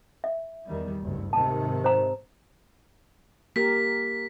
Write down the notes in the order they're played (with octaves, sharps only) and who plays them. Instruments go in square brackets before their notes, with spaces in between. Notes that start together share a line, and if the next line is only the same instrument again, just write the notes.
[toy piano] E5
[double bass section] E2 D#3 G3
F#1 D2 G2
[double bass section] G#2 C3 D#3 [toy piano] A5
[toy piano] C5 A#5
[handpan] A#3 G4 A#4 [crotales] B6